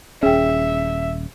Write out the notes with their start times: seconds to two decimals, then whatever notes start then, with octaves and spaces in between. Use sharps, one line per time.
0.23 D#1 C#4 G#4 E5 G5